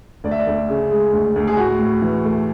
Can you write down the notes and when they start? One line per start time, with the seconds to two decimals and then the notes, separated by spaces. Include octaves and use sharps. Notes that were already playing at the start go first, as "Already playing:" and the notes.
0.24 D2 D5
0.31 E5
0.39 D5
0.47 D2
0.69 C#3
0.91 G#3
1.13 D2
1.36 D2
1.47 G#4
1.57 A2 F#4
1.79 A2
2.02 E3
2.24 A3